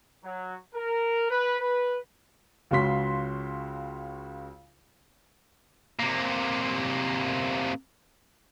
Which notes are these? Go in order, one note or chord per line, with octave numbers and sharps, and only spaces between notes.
F#3
A#4
B4
B4
C#2 C#3 F#4 C6 B6
C3 A#3